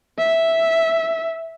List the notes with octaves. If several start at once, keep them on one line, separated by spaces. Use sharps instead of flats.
E5